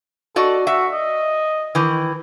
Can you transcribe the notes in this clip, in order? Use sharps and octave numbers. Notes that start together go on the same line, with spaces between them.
F#4 A4 D5 D#5
F#4 E5
D#5
D#3 E3